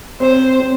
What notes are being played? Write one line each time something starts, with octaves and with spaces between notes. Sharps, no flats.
C4 C5
C4